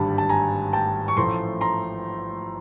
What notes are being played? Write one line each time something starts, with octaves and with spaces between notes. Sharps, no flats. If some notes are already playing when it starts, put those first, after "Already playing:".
Already playing: G#1 G2 D3 G3 A5 B5
A5
G#5 A#5
G5 A5
C#6
A1 A2 F3 A3 A#5 C6
A#5 C6